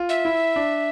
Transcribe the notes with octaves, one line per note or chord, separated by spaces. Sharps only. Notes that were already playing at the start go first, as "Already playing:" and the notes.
Already playing: F4
E5
E4
D4